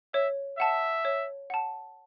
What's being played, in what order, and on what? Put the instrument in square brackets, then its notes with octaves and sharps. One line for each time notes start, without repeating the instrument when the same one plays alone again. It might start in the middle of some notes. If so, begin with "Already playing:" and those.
[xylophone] C#5 [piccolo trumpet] E5
[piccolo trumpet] E5 [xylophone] F#5 A5
[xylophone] C#5
F#5 A5